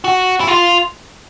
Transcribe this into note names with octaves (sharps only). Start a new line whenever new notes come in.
F#4
E4
F4